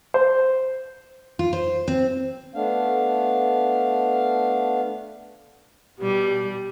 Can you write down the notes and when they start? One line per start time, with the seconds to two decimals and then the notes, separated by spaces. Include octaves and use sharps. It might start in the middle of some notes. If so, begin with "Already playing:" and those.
0.14 C5
1.39 F4
1.53 C5
1.88 C4
2.55 A3 B3 D4 F5
5.99 B2 G3 G4